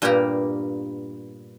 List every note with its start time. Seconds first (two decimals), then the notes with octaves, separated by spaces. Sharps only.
0.02 G2 A#2 A#3 B3 G4 A#5